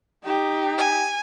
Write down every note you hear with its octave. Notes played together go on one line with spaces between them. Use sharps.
D#4 G4
G#5